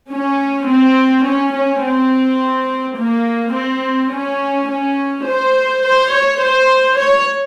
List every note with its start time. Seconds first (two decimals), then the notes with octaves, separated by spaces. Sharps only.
0.11 C#4
0.68 C4
1.25 C#4
1.54 C#4
1.83 C4
2.98 A#3
3.55 C4
4.12 C#4
4.69 C#4
5.27 C5
5.84 C5
6.13 C#5
6.41 C5
6.98 C#5